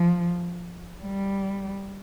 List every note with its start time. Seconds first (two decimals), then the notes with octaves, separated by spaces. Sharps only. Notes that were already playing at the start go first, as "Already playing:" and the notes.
Already playing: F3
1.04 G3